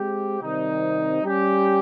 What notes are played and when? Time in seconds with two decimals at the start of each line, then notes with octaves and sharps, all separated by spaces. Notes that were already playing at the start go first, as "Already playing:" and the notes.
Already playing: G#3 C4 G4
0.41 C3 D#3 G3 C4 D#4
1.22 G3 C#4 G4